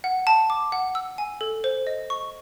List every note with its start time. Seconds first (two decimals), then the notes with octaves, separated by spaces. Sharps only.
0.04 F#5
0.27 A5
0.50 D6
0.72 F#5
0.95 E6
1.18 G#5
1.41 A4
1.64 C5
1.87 D#5
2.10 C#6